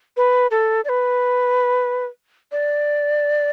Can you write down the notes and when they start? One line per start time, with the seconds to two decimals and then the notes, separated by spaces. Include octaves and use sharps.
0.17 B4
0.51 A4
0.85 D5
0.89 B4
2.52 D5